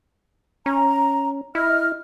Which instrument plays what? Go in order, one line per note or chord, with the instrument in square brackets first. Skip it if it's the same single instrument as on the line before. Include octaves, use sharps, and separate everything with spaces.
[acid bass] C#4 [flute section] A#5
[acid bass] E4 [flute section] D#5 F6